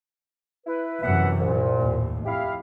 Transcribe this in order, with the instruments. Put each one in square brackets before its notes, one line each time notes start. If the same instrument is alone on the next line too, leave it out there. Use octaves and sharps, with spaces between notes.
[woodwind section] E4 B4
[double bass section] F#2 C3 E3 [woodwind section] B3 E5 F#5
[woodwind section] C2 A#2
[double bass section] D#2 A2
[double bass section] F2 [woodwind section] E4 G4 F5